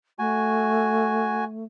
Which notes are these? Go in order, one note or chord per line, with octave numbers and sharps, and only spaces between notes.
A3 F#4 G#5